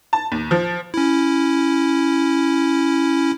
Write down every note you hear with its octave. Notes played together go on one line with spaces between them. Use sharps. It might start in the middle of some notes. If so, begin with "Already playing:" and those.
A5
D#2
F3
C#4 E4